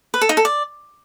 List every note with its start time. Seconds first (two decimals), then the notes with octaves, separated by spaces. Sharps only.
0.14 B4
0.21 A4
0.29 D#4
0.37 A4
0.45 D5